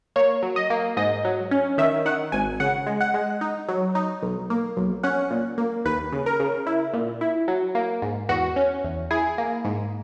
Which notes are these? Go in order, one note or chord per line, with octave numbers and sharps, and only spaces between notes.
A#3 C#5
F#3
D#5
A#3
G#2 D#5
F#3
C#4
D#3 E5
D#3 F#5
G#1 G#5
C#3 F#5
G#3
F#5
G#3
D#4
F#3
D#4
B1
A#3
B1
C#4 F#5
A#2
A#3
D#2 B4
C#3
A#4
C#3
E4
A#2
E4
F#3
A#3
G#2
E2 F#4
C#4
E2
E4 G#4
A#3
G#2